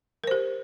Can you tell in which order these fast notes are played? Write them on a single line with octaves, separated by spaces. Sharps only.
A#4 C5 G4